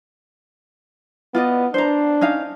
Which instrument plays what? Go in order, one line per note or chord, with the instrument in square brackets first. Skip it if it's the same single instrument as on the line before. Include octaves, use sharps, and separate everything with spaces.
[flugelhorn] B3 [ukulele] F4 D5 D#5
[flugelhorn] D4 [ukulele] C5 A#5
[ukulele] C#4 D#4 F5